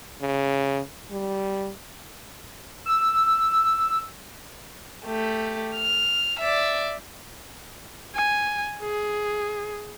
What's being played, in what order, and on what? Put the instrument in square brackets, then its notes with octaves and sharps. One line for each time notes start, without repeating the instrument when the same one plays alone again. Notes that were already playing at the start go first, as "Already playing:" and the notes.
[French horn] C#3
G3
[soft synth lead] E6
[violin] A3 G4
F6
D5 E5
[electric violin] G#5
G#4